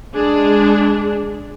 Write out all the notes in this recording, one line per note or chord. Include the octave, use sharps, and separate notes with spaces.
G#3 D4 G#4